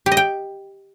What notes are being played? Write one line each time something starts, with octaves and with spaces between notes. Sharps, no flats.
G4
D#5
G5